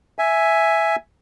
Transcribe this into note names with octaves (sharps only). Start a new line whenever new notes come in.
E5 G#5